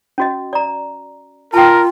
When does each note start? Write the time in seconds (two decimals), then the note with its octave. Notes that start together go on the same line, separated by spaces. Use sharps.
0.18 C#4 F#4 D#5
0.53 D5 A#5
1.54 F4 A#4 G5 A5